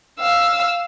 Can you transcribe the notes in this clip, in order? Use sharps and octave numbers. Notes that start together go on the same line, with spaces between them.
F5 E6